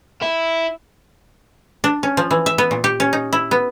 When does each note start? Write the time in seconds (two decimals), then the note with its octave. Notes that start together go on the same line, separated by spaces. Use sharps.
0.22 E4
1.84 D4
2.03 C#4
2.17 F3
2.31 E3
2.46 E5
2.58 B3
2.71 A#2
2.84 G4
3.00 C#4
3.13 D#4
3.33 E4
3.51 B3